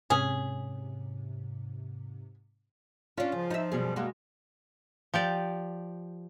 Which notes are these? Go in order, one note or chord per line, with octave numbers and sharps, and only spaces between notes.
G#2 C3 C#4 G#4
C#4 D4 F4
C#3 F3
D#4 E5
F#2 B2 G3 G#4
G#3 A#3 F#4
F3 G4 D5